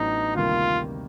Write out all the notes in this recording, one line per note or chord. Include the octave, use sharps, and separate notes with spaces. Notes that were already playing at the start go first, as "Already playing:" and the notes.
Already playing: A1 A2 F#3 B3 D4 D#4
D2 C3 D#3 G3 A#3 F4